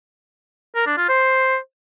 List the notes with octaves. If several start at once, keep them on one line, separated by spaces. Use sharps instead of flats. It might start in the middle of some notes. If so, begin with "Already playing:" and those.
A#4
D4
F4
C5